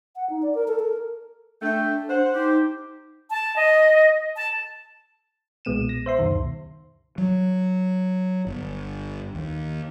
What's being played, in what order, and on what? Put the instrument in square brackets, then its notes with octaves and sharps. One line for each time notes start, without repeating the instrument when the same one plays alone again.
[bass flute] F#5
D#4
D5
A#4
A4
A#4
[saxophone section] A3 [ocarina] D4 [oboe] G5
[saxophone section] C5 [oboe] F#5
[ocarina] D#4 [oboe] G4
[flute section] A5
D#5
A5
[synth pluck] B1 A#2 G#3 B3 D#7 E7
A#6
C5 E5 C6
C#2 F#2 B2 D#3
[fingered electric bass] F#3
G1
D#2